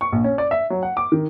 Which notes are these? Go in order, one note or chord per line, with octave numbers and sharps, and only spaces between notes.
C#6
A#1
C#4
D5
E5
F#3
F#5
D6
D#3